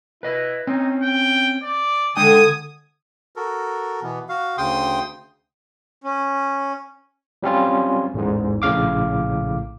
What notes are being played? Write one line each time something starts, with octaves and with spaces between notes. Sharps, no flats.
E4 B4 D#5
C4 C#4 D#4
G5
D5
D3 G#3 D4 G5 G#5 D#6
F#4 A4 A#4
B2 E3 B3
F#4 F5
D2 C#3 G5 C6 D#6
C#4
F#3 G3 C4 C#4 F4
A1 E2 G#2
A#1 A2 C#3 F5 D6